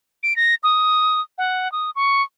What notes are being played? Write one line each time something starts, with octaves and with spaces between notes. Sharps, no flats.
D7
A#6
D#6
F#5
D#6
C#6